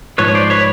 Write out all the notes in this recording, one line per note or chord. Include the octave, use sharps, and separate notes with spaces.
G#2 F3 B4 C#5
C5 D5
B4 C#5